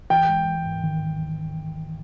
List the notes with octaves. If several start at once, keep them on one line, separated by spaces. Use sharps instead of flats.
E3 G5
G#3
E3
G#2
D#3